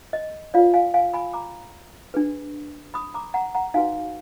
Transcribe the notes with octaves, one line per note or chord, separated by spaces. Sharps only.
D#5
F4 B4 D5 F5
F5 G#5
F5 G#5
G#5 B5
A#5 D6
D4 G#4 B4
B5 D#6
A#5 D6
F#5 A#5
F#5 A#5
D#4 F#4 B4 F5 G#5